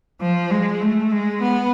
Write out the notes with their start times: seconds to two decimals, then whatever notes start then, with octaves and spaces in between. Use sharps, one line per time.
0.21 F3
0.51 G#3
0.81 A3
1.11 G#3
1.42 B3